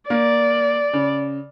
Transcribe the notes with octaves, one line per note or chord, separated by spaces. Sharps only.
A#3 D5
C#3